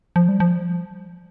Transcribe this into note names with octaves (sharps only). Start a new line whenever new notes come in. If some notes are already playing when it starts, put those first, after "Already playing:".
F3
G3
F3